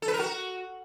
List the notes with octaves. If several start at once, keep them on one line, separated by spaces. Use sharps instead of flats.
A4
B4
A#4
F#4